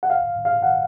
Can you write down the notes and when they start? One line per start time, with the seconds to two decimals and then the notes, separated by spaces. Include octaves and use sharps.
0.03 F#5
0.10 F5
0.45 F5
0.63 F#5